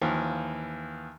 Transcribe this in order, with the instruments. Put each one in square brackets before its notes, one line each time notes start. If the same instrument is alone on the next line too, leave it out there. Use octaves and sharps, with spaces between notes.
[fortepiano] D#2 E3 F3